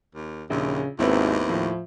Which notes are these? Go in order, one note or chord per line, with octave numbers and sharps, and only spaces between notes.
D#2
A#1 D#2 C#3
G#1 D#2 B3 C4 E4
A2 F3